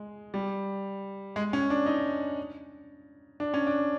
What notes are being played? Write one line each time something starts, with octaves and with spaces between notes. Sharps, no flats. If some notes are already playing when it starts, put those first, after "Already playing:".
Already playing: G#3
G3
G#3
C#4
D4
D#4
D4
C#4
D4